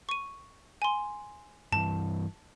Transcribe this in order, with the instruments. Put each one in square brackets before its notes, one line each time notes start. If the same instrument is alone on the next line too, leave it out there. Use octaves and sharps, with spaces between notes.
[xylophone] C#6 D#7
G#5 C6
[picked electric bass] G2 E3 [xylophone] A5